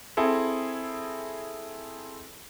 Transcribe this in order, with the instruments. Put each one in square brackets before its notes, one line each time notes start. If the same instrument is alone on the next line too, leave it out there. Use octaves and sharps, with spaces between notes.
[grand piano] C4 E4 G#4 A4